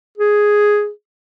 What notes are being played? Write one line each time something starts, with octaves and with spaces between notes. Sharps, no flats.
G#4